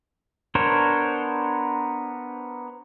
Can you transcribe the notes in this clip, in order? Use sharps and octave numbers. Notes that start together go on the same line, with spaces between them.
B3 D4 A#4 C5 C#5